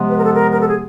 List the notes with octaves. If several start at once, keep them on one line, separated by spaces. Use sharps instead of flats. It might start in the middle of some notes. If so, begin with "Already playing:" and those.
Already playing: C3 F3 G#3 B3
B4
A#4
A4
A#4
A#4
A4
G#4